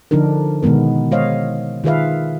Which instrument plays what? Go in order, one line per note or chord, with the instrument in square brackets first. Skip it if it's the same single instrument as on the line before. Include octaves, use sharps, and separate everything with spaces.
[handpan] D3 F3 D4 D#4 A#4
B2 D#3 G#3 B3 A#4
G#3 C5 C#5 D#5 F5
D#3 F4 G#4 B4 E5 F5